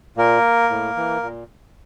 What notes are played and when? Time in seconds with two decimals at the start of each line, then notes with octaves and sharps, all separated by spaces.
0.17 A#2 A#3 A#4
0.70 A2
0.97 E3
1.23 A#2